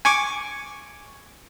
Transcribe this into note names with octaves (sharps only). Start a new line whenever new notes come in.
G#5 C#6 D6